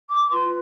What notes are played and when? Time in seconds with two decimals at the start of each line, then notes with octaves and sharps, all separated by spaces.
0.10 D6
0.24 D6
0.30 F4 B4 C6